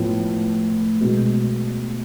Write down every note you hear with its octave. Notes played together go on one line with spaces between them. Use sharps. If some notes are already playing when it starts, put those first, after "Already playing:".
Already playing: A2 F3 B3
B2 G#3 B3